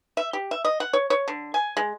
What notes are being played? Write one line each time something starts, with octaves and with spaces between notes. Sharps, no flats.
E5
G4
E5
D#5
F#5
C#5
C#5
D3
G#5
G#3